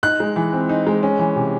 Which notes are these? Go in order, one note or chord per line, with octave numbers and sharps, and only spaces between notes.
D#4 F#6
G#3
E3
C4
D#4
G#3
C#4
E3
C3